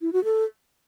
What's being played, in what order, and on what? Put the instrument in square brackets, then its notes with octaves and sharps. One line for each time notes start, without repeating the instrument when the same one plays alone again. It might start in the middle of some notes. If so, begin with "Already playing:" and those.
[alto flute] E4
F#4
A4